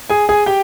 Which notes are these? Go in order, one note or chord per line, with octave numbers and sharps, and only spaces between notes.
G#4 G#5
G#4 G#5
G4 G5